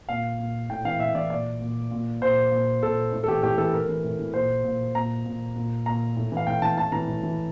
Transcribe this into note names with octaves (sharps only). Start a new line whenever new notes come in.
A#2 F5
A#2
A2 G5
E3 F5
A2 E5
E3 D5
A#2 D5
A#2
A#2
A#2 C5
A#2
A#2 A4
A2
A4
E3 G4
A2 G4
E3 A4
A2 A#4
E3
A2
E3
A#2 C5
A#2
A#2 A#5
A#2
A#2
A#2 A#5
A2
E3 F5
A2 G5
E3 A5
A2 A5
E3 A#5
A2
E3